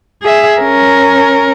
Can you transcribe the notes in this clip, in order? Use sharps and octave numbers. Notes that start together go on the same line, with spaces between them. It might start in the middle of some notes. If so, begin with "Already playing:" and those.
G#4 E5
C#4 A#4